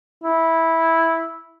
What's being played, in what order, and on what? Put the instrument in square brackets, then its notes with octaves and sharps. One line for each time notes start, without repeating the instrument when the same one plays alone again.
[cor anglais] E4